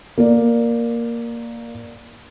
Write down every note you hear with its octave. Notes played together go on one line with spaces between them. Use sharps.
A#3 D5